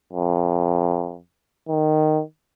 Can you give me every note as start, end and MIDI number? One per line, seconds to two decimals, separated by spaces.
0.13 1.18 41
1.69 2.21 51